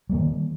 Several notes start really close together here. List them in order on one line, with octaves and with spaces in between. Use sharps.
G3 A#3 D#3